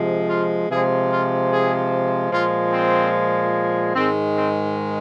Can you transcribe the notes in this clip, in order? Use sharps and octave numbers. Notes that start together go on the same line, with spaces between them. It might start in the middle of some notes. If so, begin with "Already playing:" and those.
Already playing: C3 F3 G#3
F4
C3 F3 G#3 G#4
F4
G#4
A#2 F3 G#3 F4
C4
G#2 D#3 G#3 C4
C4